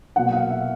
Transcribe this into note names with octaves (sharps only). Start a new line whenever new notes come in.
B2 F#3 A#3 F#5
F5
E5